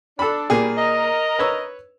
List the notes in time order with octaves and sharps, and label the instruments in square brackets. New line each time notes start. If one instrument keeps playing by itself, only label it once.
[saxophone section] D4 [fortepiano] A4 B5
[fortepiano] A#2 A#3 G#4 [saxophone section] G3
[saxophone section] A#4 D#5
[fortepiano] B4 C#5 E6